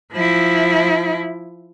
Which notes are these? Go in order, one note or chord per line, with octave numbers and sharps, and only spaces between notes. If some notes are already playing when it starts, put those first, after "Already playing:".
F3 E4